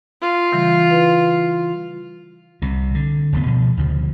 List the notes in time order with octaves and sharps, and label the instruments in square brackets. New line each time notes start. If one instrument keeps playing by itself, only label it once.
[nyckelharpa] F4
[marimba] C#3 E3 G3
E4 B4
[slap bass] C2 C3
D3
F1 D2 G2 B3
B2 F3
D2 C#3 F3